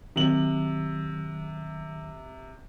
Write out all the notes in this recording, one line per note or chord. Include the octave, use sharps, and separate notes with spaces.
C3 D#3 F#3 F#7